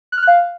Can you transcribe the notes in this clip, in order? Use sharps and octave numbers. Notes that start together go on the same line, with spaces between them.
F#6
F6
F#6
F5